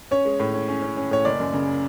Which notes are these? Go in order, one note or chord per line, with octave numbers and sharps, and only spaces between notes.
C#4 C#5
G#3
A2
C#4
C#4
C#4
C#4
A2 C#5
F#1 D5
F#2
C#3